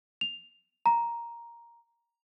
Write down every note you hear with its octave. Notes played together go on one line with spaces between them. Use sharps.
F7
A#5